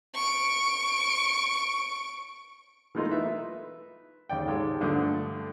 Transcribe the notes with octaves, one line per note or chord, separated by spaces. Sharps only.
C#6 D7
E3 G#3 A3 D#4 F4 A#4
B4 E5
D#2 C#3 D5 G5
G#2 G#3 G4 A4
G2 D3 F3 A3 D#6